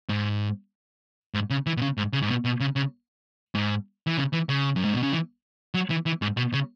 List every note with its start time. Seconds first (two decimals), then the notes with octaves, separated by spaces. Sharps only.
0.09 G#2
1.34 G#2
1.50 C#3
1.67 E3
1.77 B2
1.82 C#3
1.98 G#2
2.13 C#3
2.22 G#2
2.29 B2
2.45 B2
2.60 C#3
2.76 C#3
3.55 G#2
4.07 E3
4.18 C#3
4.33 E3
4.49 C#3
4.76 F#2
4.85 G#2
4.94 B2
5.03 C#3
5.12 E3
5.74 F#3
5.90 E3
6.06 E3
6.22 G#2
6.37 B2
6.54 C#3